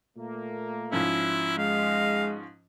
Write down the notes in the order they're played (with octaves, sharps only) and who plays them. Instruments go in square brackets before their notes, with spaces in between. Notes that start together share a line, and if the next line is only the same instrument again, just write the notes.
[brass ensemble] A#2 A3 A#3
[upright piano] G#2 F3 C#4 [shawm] E4
[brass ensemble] G#3 D#5 [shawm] F5